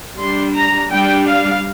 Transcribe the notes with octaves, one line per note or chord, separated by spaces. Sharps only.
G3 D4 C6
A#5
G3 D4 G5
F5